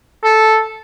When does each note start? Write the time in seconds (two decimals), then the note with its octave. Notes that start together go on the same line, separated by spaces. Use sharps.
0.24 A4